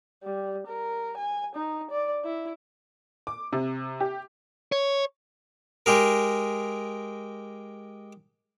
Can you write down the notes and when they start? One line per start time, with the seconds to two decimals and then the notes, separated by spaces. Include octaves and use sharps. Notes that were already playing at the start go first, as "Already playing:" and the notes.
0.24 G3
0.67 A#4
1.17 G#5
1.55 D#4
1.91 D5
2.24 E4
3.27 D6
3.53 C3
4.00 G4
4.72 C#5
5.86 G#3 G4 G#4 A#4